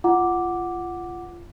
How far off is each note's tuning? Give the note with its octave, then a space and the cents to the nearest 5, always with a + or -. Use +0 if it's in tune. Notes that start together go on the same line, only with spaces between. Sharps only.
F4 -20 F#5 +0 D6 +0